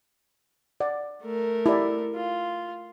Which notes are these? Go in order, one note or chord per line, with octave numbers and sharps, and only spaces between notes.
D5 F#5
A3 A#4
E4 G4 D5
F4